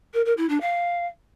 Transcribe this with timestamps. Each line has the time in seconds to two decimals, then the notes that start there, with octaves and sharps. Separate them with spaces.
0.13 A#4
0.25 A#4
0.37 E4
0.49 D4
0.60 F5